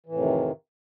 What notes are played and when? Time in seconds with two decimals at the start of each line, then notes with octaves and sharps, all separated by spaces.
0.06 E3
0.09 A2
0.12 F2
0.15 C3
0.18 D#3